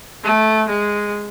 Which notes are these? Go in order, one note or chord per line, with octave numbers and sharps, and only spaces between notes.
A3
G#3